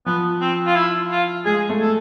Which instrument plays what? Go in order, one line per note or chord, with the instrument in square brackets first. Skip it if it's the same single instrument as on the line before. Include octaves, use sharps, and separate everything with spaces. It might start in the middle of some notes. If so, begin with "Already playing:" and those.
[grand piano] F3 [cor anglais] B3
[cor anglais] C4
F4
E4
F4
[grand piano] G#3 [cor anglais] G#4
[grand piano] A3
[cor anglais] A4